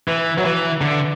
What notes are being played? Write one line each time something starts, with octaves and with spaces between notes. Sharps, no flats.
E3
F#3
E3
D3